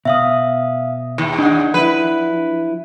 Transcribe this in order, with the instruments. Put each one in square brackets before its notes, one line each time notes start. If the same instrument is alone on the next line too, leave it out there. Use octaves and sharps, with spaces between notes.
[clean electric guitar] B2 [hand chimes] E5 F5 D#6
[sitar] D#2
[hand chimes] D4 F#5 [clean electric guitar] D#4
[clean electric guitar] F3 E4 [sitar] B4